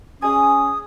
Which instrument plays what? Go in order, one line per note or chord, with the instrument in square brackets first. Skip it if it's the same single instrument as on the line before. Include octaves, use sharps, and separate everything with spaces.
[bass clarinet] C#4 [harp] G#4 D#5 G#5 [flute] D#6